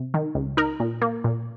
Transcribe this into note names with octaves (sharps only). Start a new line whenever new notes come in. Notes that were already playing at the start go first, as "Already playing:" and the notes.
Already playing: C3
D#3
C#2
D#4 A#4
A#2
A#3
A#2